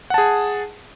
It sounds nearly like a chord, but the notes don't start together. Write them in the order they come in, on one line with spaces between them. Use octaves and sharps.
F#5 A5 G#4